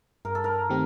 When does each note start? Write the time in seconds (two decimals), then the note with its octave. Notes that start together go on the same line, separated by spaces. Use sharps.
0.25 G2 A#4
0.35 A4
0.44 A#4
0.70 D#3 A3 C4 G4